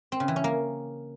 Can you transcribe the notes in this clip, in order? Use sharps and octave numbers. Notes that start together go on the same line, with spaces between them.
C4
C#3
E3
C#4
A#3